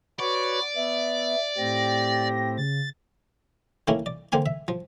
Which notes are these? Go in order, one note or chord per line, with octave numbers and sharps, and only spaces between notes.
F#4 B4 C#5 D5
B3 E5
A2 C4 G4 A#6
C#3 A6
D#3 A3 A#3 C#4 E4
D5
D3 A#3 C4 G#5 C6
E5
F3